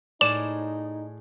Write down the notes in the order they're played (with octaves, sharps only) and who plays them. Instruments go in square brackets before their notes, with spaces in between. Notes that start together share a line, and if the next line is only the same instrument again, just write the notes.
[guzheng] A2 G#4 [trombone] D#4 [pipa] D5 [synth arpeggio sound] E7